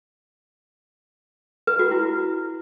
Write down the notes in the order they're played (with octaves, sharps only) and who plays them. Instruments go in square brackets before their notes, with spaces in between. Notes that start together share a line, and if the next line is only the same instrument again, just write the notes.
[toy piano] B4
F#4
E4